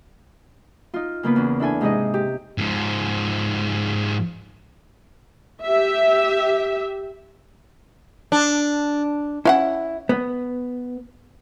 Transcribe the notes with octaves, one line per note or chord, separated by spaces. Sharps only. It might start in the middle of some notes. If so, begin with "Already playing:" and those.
D#4 F4
C#3 A#3 B3 B4
E2 C#4
D4 E4 A4 G#5
G#2 C3 G#3 D#4 G#4 D#5
G4
G#2 F3
G4 E5
D4
C#4 E4 F5 F#5
B3